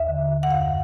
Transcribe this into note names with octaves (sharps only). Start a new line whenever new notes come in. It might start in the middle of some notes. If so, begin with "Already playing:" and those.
Already playing: D#2 E5
D3
D#2
F#5
F#2 F5